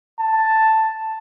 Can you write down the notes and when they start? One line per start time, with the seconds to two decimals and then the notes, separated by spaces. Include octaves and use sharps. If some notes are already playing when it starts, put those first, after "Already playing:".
0.19 A5